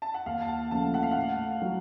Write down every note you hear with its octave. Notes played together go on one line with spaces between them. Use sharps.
A5
F#5
D#2 F5
A5
F#5
C#3 F3 A3 A5
F#5
F5
A2 F#5
F#3